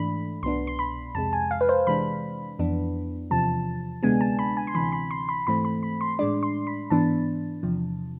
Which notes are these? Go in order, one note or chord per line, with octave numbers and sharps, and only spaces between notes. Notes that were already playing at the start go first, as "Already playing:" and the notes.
Already playing: G#2 E3 A3 D4 B5
C2 B2 B3 D4 C6
C6
B5
F2 C3 G#3 A5
G#5
F5
B4
C5
C3 E3 G#3 D4 B5
F2 E3 B3 D4
E2 C3 F3 A5
D2 C3 G#3 B3 D4 G#5
A5
B5
G#5
C6
D2 C3 E3 B5
B5
C6
B5
G#2 E3 A3 C4 B5
B5
B5
C6
A2 G#3 D4 D5
C6
B5
G#2 E3 B3 D4 A5
E2 C3 F3